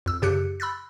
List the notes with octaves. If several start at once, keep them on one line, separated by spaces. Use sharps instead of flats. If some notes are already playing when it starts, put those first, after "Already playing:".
F2 E6
F#2 C#3 G4 F#6 C#7
B5 E6 F#6 A6